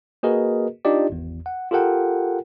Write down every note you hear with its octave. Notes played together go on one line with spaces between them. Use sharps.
A#3 F#4 G#4 A#4 B4 D#5
D4 D#4 F4 G4 D5 D#5
G#1 E2
F#5
F4 G4 A4 A#4 F#5 G5